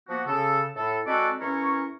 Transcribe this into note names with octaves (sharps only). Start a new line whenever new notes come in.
F3 A#3 B3 F#4
C#3 A4
A2 A4
G#3 C4 F#4 A4 B4 D5
E2 C#4 E4 A#4 C#6